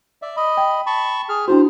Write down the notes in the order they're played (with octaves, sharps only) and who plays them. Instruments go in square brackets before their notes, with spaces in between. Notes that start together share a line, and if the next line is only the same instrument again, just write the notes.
[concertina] D5 E5
D#5 B5
[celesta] G5
[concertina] A5 B5 C#6
G#4 F6
[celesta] D4 E4 F#4 [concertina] C5